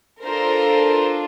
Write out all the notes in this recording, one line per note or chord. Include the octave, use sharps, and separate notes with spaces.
D4 F4 A4 A#4 C5